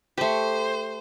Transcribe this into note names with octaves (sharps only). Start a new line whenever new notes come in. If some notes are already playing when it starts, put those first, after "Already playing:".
A3 G4 C5